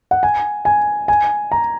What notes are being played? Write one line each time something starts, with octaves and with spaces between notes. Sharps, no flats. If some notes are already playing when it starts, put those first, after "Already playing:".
F#5
G#5
G#5
G#5
A#5